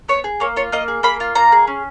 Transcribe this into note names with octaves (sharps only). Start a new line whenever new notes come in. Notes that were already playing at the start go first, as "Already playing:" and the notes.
B3 C#5
G#4
A#3 C#5
F4 C#5
A#3 D#5
G#4
A#3 B5
F4
A#3 A#5
G#4
C#4